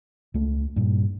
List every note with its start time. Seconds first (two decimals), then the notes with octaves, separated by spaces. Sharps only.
0.34 C#2 A3
0.76 G2 A#2